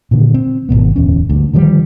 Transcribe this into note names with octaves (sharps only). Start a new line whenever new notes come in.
A#2 D3 D#3
C4
G#1 C#2 B2 B3
D1 E2 C#4
D2 G2
D3 D#3 F3 G3